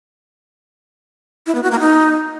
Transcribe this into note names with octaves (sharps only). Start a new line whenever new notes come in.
E4
B3
F#4
A#3
D#4